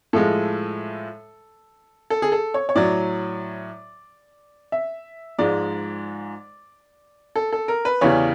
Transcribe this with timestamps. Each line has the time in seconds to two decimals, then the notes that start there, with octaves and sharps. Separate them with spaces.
0.13 A2 F3 G#3 A4
2.10 A4
2.22 G#4
2.32 A4
2.54 C#5
2.69 C#5
2.75 A2 F#3 D5
4.72 E5
5.39 G#2 F3 G#3 D5
7.36 A4
7.52 A4
7.68 A#4
7.85 B4
8.01 E2 C#3 E3 G3 C#5